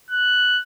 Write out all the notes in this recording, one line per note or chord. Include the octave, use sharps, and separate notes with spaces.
F#6